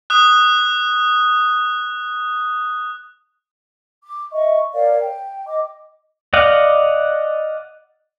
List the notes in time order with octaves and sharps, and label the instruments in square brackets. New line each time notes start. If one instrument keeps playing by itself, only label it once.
[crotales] D#6 F#6
[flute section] D6
D#5 E5 C#6
A#4 C#5 D5 F5
G5
D#5 D6
[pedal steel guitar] D5 D#5 F5 F#5